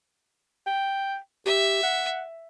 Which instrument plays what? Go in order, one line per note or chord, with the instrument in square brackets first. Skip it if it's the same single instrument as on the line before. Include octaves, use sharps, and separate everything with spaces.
[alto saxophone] G5
[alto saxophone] G4 [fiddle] E5
[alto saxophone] F#5